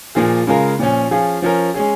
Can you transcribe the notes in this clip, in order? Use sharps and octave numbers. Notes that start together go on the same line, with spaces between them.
A#2 F3 A#3 F4 G#4
C#3 G#3 F4 A#4
A#2 F3 C#4
F3 C#4 F4 G#4
F3 C#4 A#4
G#3 C#4 G#4